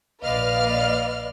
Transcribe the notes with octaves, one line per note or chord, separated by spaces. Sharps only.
A#1 B4 D5 D#5 F5 F6